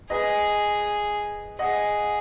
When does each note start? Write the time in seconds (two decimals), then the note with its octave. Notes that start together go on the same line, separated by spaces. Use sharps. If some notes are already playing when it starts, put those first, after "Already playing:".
0.10 G#4 B4 D#5
1.59 G#4 D#5 F#5